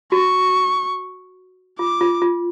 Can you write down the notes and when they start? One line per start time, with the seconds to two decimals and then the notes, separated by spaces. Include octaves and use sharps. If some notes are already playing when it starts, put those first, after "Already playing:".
0.12 F#4 C#6
1.79 F4 D6
2.01 F4
2.22 F4